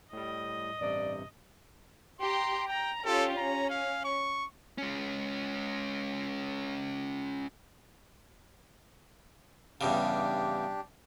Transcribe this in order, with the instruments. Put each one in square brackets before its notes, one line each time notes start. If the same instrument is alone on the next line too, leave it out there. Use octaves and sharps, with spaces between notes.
[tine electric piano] A2 G3 [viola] D#5
[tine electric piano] A1 G2 C3 [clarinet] D5
[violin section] G4 A#5 [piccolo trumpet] C6
[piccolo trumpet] G5 [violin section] A#5
[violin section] C#4 F4 G4 [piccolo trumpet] A4
[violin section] C#4 [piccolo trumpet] A#5
[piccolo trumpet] F5
C#6
[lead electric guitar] G#3 C#4
[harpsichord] E2 G2 C#3 [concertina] D4 G4